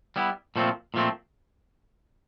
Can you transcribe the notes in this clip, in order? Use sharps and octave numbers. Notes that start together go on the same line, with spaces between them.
G3 B3 E4
A#2 F3 A3 C4
A#2 F3 A3 C4